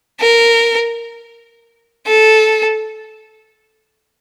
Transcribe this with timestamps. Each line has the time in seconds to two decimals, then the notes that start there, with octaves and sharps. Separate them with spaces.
0.20 A#4
2.07 A4